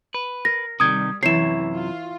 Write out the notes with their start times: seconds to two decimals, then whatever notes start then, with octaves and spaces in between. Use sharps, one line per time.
0.14 B4
0.45 A#4 A#6
0.80 C3 D#3 G3 D#6 G#6
1.23 F#2 C3 E3 E4 C#5 C7 E7
1.76 F4